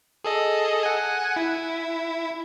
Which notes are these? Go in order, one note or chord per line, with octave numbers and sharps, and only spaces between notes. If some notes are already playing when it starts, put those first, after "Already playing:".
G#4 A4 D#5
F#5 G#5
E4